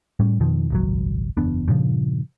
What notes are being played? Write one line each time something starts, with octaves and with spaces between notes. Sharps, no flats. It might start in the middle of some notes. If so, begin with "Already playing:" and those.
A2 G3 C#4
F2 B2 D#3 F3
D#1 G#1 C#2 F#3
F#1 E2 B3 D4
G2 A#2 C#3 F3